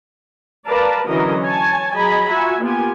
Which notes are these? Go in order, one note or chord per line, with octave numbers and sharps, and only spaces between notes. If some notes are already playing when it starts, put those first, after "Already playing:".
A#4 B4 D5 F5 A5 A#5
D3 E3 F#3 C#4 A#4 D#5
C#5 G#5 A5
F#3 G#4 D#5 G#5 A#5 B5
F4 F#4 E5 G#5
A#3 B3 F4 G4 G#5